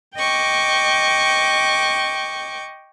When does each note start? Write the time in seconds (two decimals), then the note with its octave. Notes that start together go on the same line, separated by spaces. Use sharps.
0.15 D#5 G5 C#6 D6